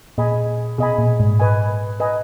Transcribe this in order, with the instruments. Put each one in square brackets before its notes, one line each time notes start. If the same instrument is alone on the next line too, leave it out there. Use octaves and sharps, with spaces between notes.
[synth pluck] A#2 [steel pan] G#4 D#5 G#5 B5
[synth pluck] B2 [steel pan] G#4 D#5 G#5 B5
[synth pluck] A#2
G#2
[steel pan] B4 D#5 G#5
B4 D#5 G#5